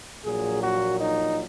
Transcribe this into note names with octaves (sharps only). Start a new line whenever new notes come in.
A#1 A#2 F#3 G#4
F#4
D#4